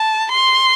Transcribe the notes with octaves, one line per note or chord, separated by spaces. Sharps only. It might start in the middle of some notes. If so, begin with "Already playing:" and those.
Already playing: A5
C6